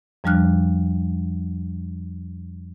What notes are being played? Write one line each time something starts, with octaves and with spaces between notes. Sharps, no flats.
F2 F3 G3 D4 F6 F#6